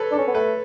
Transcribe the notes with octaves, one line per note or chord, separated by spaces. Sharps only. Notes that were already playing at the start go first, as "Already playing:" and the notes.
Already playing: A4 B4 C#5
D4 A4
C#4
B3
A3 B4